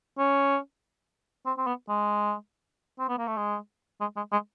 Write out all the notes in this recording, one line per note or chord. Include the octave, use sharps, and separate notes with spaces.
C#4
C4
C4
B3
G#3
C4
B3
A#3
A3
G#3
G#3
G#3
G#3